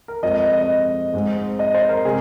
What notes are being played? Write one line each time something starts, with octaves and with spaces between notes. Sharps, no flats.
A#4
F2 F3 G#3 C4 D#5
D#5
D#5
G#2 G#3 C4
D#5
C5
A#4
C3 G#3 C4 G#4